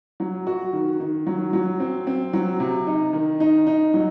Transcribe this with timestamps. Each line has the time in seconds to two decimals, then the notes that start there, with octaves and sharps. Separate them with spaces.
0.20 F#3
0.47 F#4
0.73 D#3
1.00 D#3
1.27 F#3
1.53 F#3
1.80 C4
2.07 C4
2.33 F#3
2.60 C3
2.87 D#4
3.13 D#3
3.40 D#4
3.67 D#4
3.94 F#3